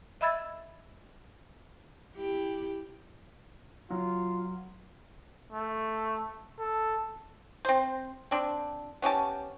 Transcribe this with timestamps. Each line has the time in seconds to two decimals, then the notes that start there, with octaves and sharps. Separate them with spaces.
0.21 D#5 E5 B5 E6 G#6 A6
2.16 E4 G4
3.90 F#3 F4
5.52 A3
6.59 A4
7.65 C4 C5
8.31 C4 D4
9.02 B3 C#4 G4 A5